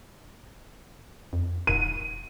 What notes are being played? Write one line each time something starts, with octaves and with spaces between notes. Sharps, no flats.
F2
D#1 D#7